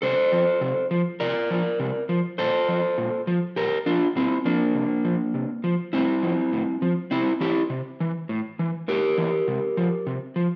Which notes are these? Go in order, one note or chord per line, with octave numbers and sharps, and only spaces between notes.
C3 A4 C5
F3
C3
F3
C3 A#4 D5
F3
C3
F3
A#2 A4 C5
F3
A#2
F3
A#2 G4 A#4
F3 D4 F4
A#2 C4 E4
F3 A#3 D4
C3
F3
C3
F3
A2 C4 E4
F3
A2
F3
C3 C4 E4
E3 E4 G4
C3
E3
A2
E3
A2 G4 A#4
E3
C3
F3
C3
F3